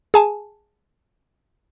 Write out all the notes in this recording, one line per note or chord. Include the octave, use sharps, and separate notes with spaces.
G#4 G#5 A5